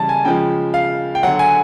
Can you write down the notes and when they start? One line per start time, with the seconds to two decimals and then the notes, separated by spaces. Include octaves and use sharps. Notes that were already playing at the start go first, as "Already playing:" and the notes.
Already playing: C#3 E3 G3 A5
0.09 G#5
0.25 C#3 F3 G#3 G5
0.74 F5
1.15 G5
1.23 D3 F#3 F#5
1.39 G#5